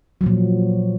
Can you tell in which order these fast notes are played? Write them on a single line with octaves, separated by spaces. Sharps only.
F#3 F3 A#2